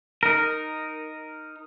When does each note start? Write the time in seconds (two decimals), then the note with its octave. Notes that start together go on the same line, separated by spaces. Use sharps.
0.23 D#4 A#4